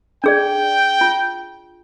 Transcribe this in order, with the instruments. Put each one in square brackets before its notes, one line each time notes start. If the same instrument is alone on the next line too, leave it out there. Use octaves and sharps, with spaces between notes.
[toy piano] D4 G#4 D5 [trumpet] G5
[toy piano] F4